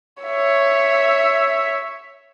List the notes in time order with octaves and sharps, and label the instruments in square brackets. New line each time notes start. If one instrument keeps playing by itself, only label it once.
[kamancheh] C#5 E5